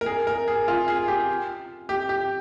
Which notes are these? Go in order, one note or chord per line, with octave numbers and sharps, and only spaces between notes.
A#4
G#4
A#4
G#4
F4
G#4
G4
G4
G4